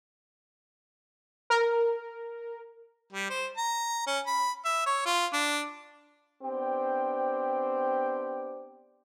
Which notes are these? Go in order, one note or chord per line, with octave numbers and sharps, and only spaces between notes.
A#4
G3
C5
A#5
C#4
B5
E5
C#5
F4
D4
B3 C4 D4 G4 C5 G5